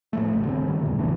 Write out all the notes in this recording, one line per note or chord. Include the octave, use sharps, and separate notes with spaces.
A2 F3 A3
F#1 C2 G2 B2
D3 A#3 C4
G2 D#3
E2 G2 A#2 A3
A#1 C#3 E3 D4